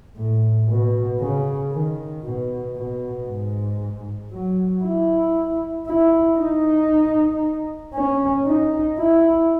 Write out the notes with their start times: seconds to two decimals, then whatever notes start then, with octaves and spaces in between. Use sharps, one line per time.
0.17 A2
0.69 B2
1.20 C#3
1.72 D#3
2.24 B2
2.76 B2
3.28 G#2
4.32 F#3
4.84 E4
5.87 E4
6.38 D#4
7.95 C#4
8.46 D#4
8.98 E4